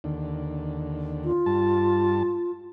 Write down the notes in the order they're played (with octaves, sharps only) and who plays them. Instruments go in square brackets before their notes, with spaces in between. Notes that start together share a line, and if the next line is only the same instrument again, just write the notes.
[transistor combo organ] D#2 D3
[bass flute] F4
[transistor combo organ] G2 A5